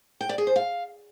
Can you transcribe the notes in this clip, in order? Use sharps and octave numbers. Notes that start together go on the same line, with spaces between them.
G5
D5
G#4
C5
F5